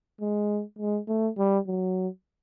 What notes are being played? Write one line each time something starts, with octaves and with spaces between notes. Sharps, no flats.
G#3
G#3
A3
G3
F#3